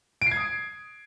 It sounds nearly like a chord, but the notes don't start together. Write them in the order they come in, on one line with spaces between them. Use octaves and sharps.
D7 C7 G#6 D#6